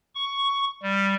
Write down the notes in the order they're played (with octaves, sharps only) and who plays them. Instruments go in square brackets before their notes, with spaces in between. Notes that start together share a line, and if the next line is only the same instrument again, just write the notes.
[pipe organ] C#6
G3